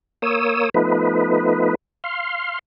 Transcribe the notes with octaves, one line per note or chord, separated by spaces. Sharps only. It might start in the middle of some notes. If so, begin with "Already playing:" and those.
A#3 C#5 D#6 E6
F3 A3 B3 D#4 B4
F5 C6